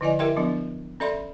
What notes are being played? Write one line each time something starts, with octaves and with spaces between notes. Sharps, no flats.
D3 F3 E4 D5 D#5 G#5
E4 G4 A#4 E5 G5 C6
F3 F#3 B3 D4
C#4 A4 D5 E5 B5 C6